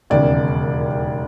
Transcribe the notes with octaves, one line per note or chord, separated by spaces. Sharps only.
E1 D#2 C#3 D5